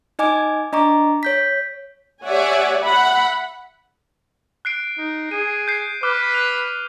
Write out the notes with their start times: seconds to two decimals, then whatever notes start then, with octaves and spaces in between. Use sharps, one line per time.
0.19 D#4 D#5 G#5 D6 G#6
0.73 D4 D#5 A#5 C#6 D6
1.23 C#5 G6 B6
2.24 G4 C#5 D5 E5 F#5 G#5
2.81 E5 F#5 B5
4.65 F#6 C7 D7
4.98 D#4
5.31 G#4 D#7
5.68 G6 C7
6.03 B4 D6 F6
6.34 G6 F7